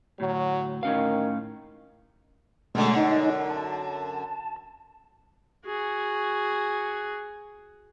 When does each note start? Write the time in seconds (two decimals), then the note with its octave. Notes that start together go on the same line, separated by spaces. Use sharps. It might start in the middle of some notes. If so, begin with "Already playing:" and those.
0.20 D2 A2 F#3
0.83 A2 D#3 C#4 F5
2.75 F#2 B2 D3 G#3 A3
2.97 D#4 D#5
3.49 A5
5.66 F#4 G#4